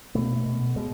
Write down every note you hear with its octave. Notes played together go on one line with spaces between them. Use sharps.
B2 A3
B2
B2 G#3